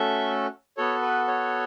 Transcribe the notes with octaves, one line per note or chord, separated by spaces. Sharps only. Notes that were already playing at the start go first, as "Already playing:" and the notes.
Already playing: A3 C#4 F#4 A4 E5
B3 F#4 A4 C#5
B4
C#5